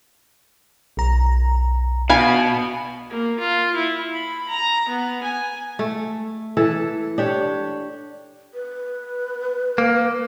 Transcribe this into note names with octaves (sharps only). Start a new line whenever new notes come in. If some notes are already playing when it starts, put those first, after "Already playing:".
B1 A#5
B2 F5 G#5 B5
A#3
F4
E4
B5
A#5
B3
G#5
A3
E3 A4 B4
D4 G4 C#5
B4
A#3